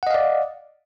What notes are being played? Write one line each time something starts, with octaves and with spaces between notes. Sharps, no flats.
D5 D#5 F5 F#5